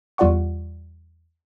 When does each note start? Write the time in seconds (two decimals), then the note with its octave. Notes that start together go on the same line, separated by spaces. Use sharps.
0.18 E2 G3 F4 D5 F#5 C#6